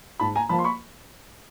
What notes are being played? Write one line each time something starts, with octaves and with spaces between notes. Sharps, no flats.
G#2 A5 B5
G#5 A#5
F3 A#3 A5 B5
C6
B5 C#6